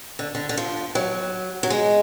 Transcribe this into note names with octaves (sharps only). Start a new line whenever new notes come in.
D3
D3
D3
F3
F#3
F#3
G#3